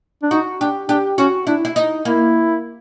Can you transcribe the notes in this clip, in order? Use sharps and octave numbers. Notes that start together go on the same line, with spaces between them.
D4
D#4 F#4
D4 G4
D4 G4
C#4 F#4
D4 E4
E4
D#4
A#3 E4